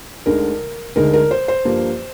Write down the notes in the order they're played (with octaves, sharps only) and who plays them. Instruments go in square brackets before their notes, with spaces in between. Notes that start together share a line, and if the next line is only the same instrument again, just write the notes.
[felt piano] D2 D3 G#3 D#4 A#4
D2 D3 G#3 D#4 A#4
A#4
C5
C5
G2 F3 A#3